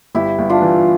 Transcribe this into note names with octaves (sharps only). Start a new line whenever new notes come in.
G1 E4 G4
G1
D4 F4
E3